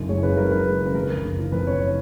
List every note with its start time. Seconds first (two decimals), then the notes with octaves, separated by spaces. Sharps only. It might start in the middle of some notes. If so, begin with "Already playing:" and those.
Already playing: F#1 F#2
0.09 G#3 C#5
0.23 C#3 B4
0.37 F#2 A#4
0.51 F#1 B4
0.67 G#3
0.81 C#3
0.86 B4
0.95 F2 A#4
1.09 F#1
1.24 F#1
1.39 F3
1.52 F2 B4
1.67 F#1 C#5
1.81 C#5